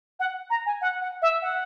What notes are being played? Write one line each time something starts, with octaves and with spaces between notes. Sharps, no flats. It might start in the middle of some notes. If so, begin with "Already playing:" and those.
F#5
A#5
G#5
F#5
F#5
E5
F#5